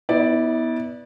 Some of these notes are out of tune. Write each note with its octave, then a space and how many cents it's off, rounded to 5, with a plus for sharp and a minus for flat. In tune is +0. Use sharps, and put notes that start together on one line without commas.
B3 -5 E4 -35 D5 +0